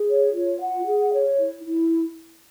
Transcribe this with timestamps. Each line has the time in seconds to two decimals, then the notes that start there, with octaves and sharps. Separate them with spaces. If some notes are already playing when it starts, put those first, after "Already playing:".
Already playing: G#4
0.08 C#5
0.34 F4
0.61 F#5
0.86 G#4
1.12 C#5
1.38 E4
1.65 E4